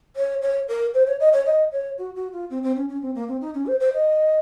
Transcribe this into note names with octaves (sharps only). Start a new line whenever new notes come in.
C#5
C#5
A#4
C5
C#5
D#5
C#5
D#5
C#5
F#4
F#4
F4
C4
C4
C#4
C#4
C4
A#3
C4
D#4
C#4
C5
C5
D#5